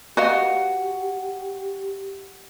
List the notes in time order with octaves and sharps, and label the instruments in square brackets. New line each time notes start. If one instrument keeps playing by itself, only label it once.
[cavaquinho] F#4 [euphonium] G4 [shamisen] B4 D#5 F5